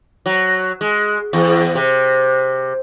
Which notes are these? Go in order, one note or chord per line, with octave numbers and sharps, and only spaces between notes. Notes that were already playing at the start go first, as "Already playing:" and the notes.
F#3
G#3
E2
C3